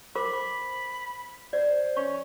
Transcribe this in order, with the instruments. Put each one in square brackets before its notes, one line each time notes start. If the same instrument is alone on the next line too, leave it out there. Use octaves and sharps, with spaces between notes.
[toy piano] A#4 C5 D6 [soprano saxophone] B5
[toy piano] D6
[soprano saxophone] C5 [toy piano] D5
[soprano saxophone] C#4 [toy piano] C#6